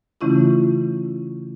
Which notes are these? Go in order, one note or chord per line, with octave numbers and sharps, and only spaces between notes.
C#3 E3 A3 C#4 E4 F4